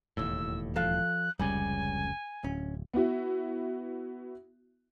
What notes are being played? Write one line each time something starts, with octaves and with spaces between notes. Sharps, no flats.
E1 D#2 A2 E6
F3 A4 F5 F#6
F1 C#2 C#3 G3 G#5
D1 C#4
B3 E4 F#4 E5